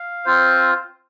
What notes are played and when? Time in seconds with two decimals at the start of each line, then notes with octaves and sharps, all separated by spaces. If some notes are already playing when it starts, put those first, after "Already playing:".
Already playing: F5
0.25 C4 F4 C5